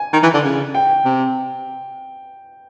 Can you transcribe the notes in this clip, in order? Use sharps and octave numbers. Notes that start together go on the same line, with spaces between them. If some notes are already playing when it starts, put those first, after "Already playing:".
Already playing: G#5
D#3
E3
D3
C#3
G5
C3